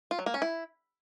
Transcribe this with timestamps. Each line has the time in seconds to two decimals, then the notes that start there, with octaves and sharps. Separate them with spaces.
0.11 F4
0.19 F#3
0.26 A#3
0.34 C#4
0.42 E4